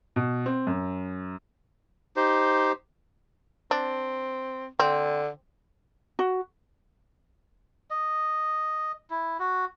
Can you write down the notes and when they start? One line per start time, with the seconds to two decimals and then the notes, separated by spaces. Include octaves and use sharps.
0.16 B2
0.46 C4
0.67 F#2
2.16 D#4 G4 C5
3.71 C4 D4
4.80 D3 C4
6.19 F#4
7.90 D#5
9.11 E4
9.39 F#4